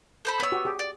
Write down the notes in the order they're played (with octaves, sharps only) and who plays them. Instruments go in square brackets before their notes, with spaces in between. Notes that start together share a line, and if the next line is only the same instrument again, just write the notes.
[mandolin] A4 C5 B5
[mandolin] B3 E6 [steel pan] C#5 B5
[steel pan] F#4 G4
G4 G#4
[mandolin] D5